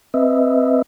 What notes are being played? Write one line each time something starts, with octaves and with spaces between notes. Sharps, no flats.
C4 B4 D#5 E5